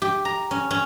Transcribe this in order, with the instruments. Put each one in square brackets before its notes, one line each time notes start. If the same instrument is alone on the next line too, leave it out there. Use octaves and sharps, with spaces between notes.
[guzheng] G4
A#5
C#4
C#4